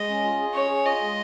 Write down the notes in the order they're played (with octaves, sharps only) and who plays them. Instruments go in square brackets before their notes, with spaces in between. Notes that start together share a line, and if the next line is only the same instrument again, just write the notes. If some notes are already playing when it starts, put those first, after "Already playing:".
Already playing: [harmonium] G#3 [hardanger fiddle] D#5
[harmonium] C#4
F4
G#4
[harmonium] C#4 [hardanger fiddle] C#5
[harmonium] G#4
[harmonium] F4 [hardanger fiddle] D#5
[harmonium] G#3